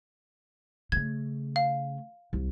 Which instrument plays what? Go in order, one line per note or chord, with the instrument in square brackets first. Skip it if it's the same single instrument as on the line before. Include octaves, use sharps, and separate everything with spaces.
[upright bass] C#3 A3 [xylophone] G#6
[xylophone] F5
[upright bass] C2